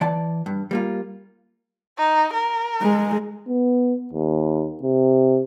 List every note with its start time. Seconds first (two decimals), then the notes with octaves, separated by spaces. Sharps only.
0.01 E3 D5 A5
0.46 G2
0.71 G3 A#3 F4
1.98 D#4
2.34 A#4
2.82 G#3
3.48 B3
4.13 D#2
4.83 C3